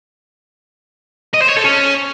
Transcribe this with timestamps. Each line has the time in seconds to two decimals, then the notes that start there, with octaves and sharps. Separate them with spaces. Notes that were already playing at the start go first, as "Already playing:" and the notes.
1.34 D#5
1.41 C5
1.49 C#5
1.57 A4
1.64 C#4